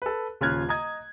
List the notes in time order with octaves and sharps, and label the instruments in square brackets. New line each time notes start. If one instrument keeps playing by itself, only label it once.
[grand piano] A4 B4
D#1 C#3 F4 F6 F#6 G#6
D#5 A#5 D#6 G#6